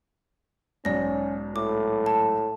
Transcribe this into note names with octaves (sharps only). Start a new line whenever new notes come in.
B1 G#2 C#4 D5 A#6
A2 D6
A5